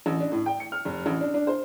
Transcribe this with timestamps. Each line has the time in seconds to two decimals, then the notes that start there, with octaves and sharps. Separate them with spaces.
0.06 A1
0.20 D4
0.32 A2
0.46 G5
0.60 C#7
0.72 F6
0.85 F1
1.06 A1
1.21 D4
1.34 D4
1.47 C5